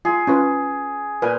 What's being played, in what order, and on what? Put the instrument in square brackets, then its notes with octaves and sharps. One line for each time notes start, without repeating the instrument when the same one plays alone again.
[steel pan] F4 [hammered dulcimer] G#4
[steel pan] C#4 F4 B4
[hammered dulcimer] A#2 [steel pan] B4 G#5